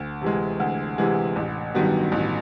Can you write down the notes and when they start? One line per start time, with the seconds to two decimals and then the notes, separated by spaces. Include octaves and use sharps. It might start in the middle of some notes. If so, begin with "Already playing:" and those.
Already playing: D2
0.21 C3 E3 G#3
0.60 D2
0.98 C3 E3 G#3
1.36 A1
1.75 G2 D#3 F#3 B3
2.12 A1